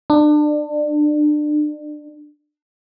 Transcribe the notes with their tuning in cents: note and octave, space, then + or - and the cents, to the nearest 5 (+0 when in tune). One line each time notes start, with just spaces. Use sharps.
D4 +30